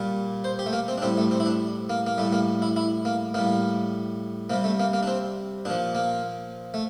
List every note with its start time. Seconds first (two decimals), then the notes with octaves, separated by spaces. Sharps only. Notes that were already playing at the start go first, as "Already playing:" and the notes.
Already playing: A#2 G3
0.44 C5
0.59 G4
0.66 A3
0.73 A#3
0.88 C4
0.98 D4
1.02 A2 G3 C4
1.17 A3
1.31 C4
1.40 E4
1.46 D4
1.90 A#3
2.07 A#3
2.18 A2 G3 A3
2.33 A#3
2.62 E4
2.76 E4
3.05 A#3
3.34 A2 G3 A#3
4.50 C3 G3 A#3
4.64 A3
4.80 A#3
4.93 A#3
5.03 D4
5.07 C4
5.65 A#2 F3 D4
5.95 A#3
6.74 A3